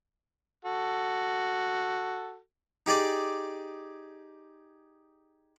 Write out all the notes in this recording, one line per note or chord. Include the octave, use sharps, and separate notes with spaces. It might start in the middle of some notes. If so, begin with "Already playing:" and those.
F#4 A4
D#4 G4 G#4 D5 G#5